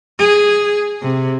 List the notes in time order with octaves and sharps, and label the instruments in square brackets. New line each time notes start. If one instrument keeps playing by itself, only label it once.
[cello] G#4
C3